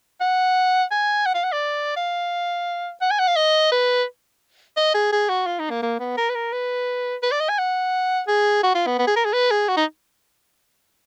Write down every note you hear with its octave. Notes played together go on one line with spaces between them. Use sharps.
F#5
G#5
F#5
F5
F#5
D5
F5
F#5
G#5
F#5
F5
D#5
B4
D#5
G#4
G#4
F#4
F4
D#4
A#3
A#3
B3
A#4
B4
A#4
B4
B4
D5
D#5
G#5
F#5
G#4
F#4
F4
B3
B3
G#4
A#4
G#4
B4
G#4
F#4
D#4